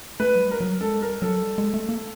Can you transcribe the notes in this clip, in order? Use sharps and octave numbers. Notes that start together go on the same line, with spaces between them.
A3 B4
F#3
G3
A#4
F#3
G#3 A4
G3 A#4
F#3 A4
G3
G#3
A3
A#3